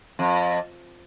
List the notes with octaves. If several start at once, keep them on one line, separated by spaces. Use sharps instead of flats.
F2